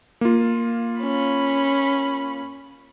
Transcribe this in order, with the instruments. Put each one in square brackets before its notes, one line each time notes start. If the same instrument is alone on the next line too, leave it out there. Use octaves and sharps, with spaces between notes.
[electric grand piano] A#3 F4
[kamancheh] C#4 B5